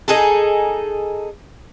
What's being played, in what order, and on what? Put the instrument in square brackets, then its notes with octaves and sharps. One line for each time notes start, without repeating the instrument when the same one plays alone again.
[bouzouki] D#4 G#4 A4